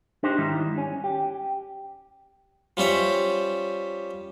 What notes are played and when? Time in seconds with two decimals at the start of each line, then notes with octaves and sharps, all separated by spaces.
0.23 D4 D#4 G4 C5
0.38 G#2 D#3 G3 E4
0.78 C#4
1.04 G4
2.77 F3 G3 C#4 E5